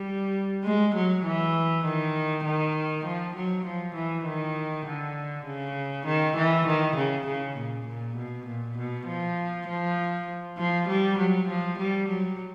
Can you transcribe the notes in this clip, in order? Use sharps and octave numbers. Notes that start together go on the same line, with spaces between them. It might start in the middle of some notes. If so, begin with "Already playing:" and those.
Already playing: G3
G#3
F#3
E3
D#3
D#3
F3
F#3
F3
E3
D#3
D3
C#3
D#3
E3
D#3
C#3
C#3
A#2
A#2
B2
A#2
B2
F3
F3
F3
G3
F#3
F3
G3
F#3